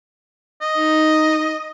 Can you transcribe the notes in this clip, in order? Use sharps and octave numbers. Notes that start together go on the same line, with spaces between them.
D#5
D#4